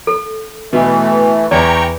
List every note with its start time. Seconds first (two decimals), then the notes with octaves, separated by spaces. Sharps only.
0.07 A4
0.73 B2 E3 A3
1.51 E2 D5 G5 A#5 C#6